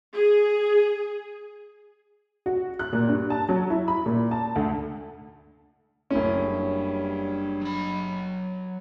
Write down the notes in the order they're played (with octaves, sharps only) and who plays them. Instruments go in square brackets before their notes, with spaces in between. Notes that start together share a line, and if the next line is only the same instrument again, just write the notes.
[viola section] G#4
[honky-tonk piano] F#4
F#6
A#2
G2
A5
F#3
E4
B5
A#2
A5
D2
[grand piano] F#1 C#4 [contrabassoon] A2
[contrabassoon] G2
[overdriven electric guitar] F#3 B5